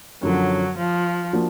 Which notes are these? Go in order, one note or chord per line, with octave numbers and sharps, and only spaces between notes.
F#2 D3 F3 F#3
F3
F3 A#3 D4 F#4